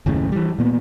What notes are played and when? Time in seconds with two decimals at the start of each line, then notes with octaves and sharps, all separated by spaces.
0.06 F#1 D#2 A2 C#3
0.32 E3 G3
0.58 A#2 A#3 B3